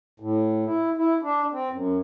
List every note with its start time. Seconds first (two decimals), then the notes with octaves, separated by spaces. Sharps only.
0.20 A2
0.65 E4
0.97 E4
1.23 D4
1.52 C4
1.71 F#2